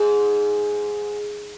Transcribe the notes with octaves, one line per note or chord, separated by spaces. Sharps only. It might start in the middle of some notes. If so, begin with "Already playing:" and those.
Already playing: G#2